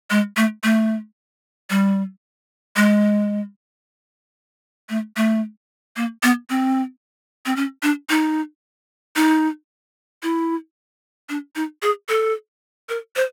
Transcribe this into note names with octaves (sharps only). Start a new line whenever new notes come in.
G#3
A3
A3
G3
G#3
A3
A3
A#3
B3
C4
C4
C#4
D4
D#4
D#4
E4
D4
D#4
G#4
A4
A#4
C5